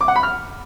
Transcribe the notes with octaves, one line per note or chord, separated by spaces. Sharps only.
D6
F#5
B5
F6